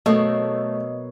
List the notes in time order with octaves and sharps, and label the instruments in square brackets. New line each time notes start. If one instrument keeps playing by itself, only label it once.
[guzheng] B2 F#3 A#3 [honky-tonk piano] A3 [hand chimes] D#5